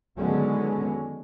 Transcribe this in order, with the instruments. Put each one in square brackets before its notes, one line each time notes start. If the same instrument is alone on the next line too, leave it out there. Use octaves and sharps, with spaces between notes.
[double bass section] D3 D#3 F#3 G#3 B3 C#4